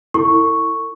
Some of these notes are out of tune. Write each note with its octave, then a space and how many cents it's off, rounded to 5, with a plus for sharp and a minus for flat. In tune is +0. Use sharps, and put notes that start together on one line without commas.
E4 +0 A4 +45 C#6 +0